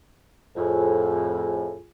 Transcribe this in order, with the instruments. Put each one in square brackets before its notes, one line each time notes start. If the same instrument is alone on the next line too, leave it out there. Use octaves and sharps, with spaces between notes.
[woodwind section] F2 A2 [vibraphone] F4 G#4 G#5